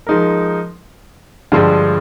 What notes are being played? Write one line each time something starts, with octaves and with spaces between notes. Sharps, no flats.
F3 G#3 D#4 A#4
G2 D3 F3 G#3